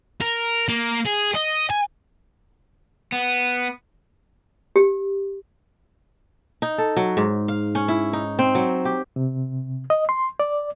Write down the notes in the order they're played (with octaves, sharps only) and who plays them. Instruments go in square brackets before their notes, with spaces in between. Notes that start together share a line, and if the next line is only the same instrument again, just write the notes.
[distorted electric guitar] A#4
A#3
G#4
D#5
G#5
[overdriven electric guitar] B3
[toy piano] G4
[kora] D#4
A4
F#3
G#2
F5
C#4
E4
D#4
C4
F#3
G4
[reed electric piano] C3
D#5
C6
D5